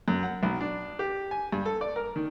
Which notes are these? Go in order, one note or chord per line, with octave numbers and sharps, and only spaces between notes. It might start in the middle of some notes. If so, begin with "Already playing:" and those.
F#2
F#5
B1
D4
G4
G#5
G2
A4
D5
A#4
D#3